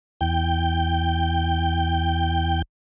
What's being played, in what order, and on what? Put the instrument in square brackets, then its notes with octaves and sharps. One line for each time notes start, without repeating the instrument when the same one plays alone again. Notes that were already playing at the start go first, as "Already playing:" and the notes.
[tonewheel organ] E2 G5